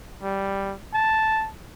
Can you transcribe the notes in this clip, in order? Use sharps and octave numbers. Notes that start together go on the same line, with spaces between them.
G3
A5